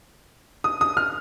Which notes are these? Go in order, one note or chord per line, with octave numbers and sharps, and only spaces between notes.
D#6
D#6
F6